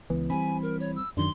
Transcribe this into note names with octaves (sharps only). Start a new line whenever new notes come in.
C#2 E3 B3
G3 A#3 C4 G#5 B5
A#4
C#5
E6
F#2 D#3 F#3 D4 C6